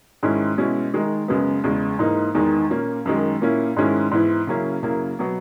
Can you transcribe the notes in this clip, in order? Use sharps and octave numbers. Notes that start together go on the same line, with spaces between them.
G#2 D#3 G#3 C#4 E4
B2 G#3 C#4 E4
D#3 G#3 D#4
F#2 C#3 G#3 B3
E2 C#3 G#3
G#2 E3 A#3 D#4
E2 D#3 G#3 D#4
A#2 A#3 C#4
F#2 D#3 G#3
A#2 A#3 C#4 E4
G#2 D#3 G#3 C#4 E4
G#2 E3 B3 E4
C#3 F#3 A#3 C#4 E4
F#2 C#3 F#3 A#3 E4
B2 F#3 B3